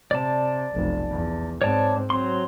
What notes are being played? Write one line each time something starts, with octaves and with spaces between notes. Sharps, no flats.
C3 D5 A5
F1 B1
E2
G#2 C4 C#5 D5 A5
F#3 C4 C6